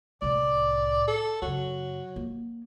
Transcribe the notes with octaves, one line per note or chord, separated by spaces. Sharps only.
C2 A2 D5
A4
F#2 C#3 F#3
A#3